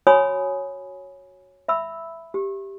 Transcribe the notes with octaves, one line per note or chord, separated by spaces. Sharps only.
F#4 C#5 G#5 B5 D#6
E5 B5 E6
G4